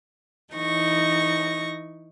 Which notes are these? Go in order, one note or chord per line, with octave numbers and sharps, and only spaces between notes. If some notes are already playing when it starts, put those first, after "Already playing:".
E3 D#4 C#6 A#6